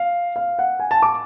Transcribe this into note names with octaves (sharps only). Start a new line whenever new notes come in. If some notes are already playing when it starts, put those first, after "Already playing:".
Already playing: F5
F5
F#5
G#5
A5
D6